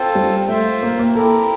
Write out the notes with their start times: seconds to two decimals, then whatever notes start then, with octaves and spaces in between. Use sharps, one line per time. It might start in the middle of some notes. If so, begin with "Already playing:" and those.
Already playing: C4 F4 A4 C5
0.15 G3
0.48 A3 F4 C5 E5 G5
0.83 A#3
0.99 A#3
1.15 C4 E4 G4 A4 A#4